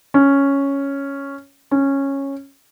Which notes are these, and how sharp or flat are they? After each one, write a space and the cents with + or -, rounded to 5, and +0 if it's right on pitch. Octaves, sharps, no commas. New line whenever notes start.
C#4 +0
C#4 -10